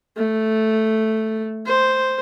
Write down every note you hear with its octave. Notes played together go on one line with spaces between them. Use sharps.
A3
C5